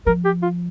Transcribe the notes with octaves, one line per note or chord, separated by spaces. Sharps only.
F3 A#4
G4
F4